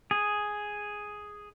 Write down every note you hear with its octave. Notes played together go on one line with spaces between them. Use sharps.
G#4